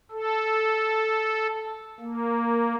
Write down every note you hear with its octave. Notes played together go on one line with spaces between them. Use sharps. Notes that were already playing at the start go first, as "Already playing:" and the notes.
A4
A#3